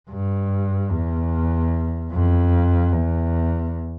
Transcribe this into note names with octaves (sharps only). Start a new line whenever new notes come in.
G2
E2
F2
E2